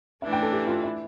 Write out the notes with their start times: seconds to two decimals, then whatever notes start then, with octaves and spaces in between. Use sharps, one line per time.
0.22 E3 A3 D4 E5
0.33 G5
0.43 A4
0.53 G4
0.67 F4
0.83 E4